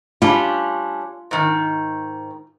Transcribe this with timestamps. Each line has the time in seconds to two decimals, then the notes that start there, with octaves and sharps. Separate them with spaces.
0.22 G3 C#4 D4 F4
1.31 G#2 D#3